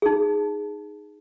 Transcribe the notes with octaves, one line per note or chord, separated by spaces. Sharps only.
D#4 G#4